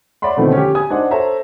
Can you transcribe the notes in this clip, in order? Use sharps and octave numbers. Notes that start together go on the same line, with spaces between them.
C#5 D5 E5 F#5 B5 C6
B2 D3 D#3 F3 A3 C4
C#4 G4
G#5 D#6 G#6
D4 D#4 C5 F#5
A4 C5 C#5 E5 A#5